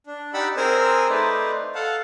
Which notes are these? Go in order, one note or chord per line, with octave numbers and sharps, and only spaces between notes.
D4
D#4 G4 D5 F#5 B5 E6
C4 G#4 A#4 C5 G#5 E6
A3 D#4 B4 C5 D5
A4 F5 F#5 A5